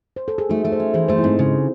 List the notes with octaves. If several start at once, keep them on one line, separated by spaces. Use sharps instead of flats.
C5
A4
G#4
A3 D#4 F#4
A3 A4
G#4 C5
C#4
E3 G#4 C5
A3 G#4 C5
E4
G#2 C4 D#4
C#3